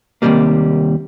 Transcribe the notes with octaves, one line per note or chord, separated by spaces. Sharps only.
D#2 C3 E3 F3 G3 A#3